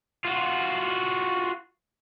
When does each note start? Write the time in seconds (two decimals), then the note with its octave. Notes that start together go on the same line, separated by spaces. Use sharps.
0.25 F4 F#4